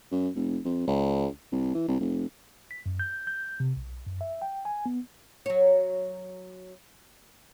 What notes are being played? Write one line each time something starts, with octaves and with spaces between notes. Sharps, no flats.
F#2
F1
F2
C#2
C2
E3
C2
F1
B6
F#2
G6
G6
C3
B1
F#2
E5
G5
G#5
B3
F#3 C#5